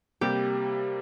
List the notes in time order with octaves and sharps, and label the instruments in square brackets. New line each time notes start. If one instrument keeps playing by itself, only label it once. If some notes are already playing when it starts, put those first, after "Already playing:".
[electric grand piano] C3 G3 A#3 [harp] G4